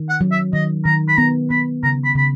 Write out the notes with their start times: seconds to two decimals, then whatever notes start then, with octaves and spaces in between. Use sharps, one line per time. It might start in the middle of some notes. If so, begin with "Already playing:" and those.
Already playing: D#3
0.09 F#5
0.21 F#3
0.31 E5
0.53 D#3 D#5
0.85 D#3 A#5
1.08 B5
1.17 B3 A#5
1.50 B3 B5
1.83 C#3 A#5
2.04 B5
2.15 C#3 B5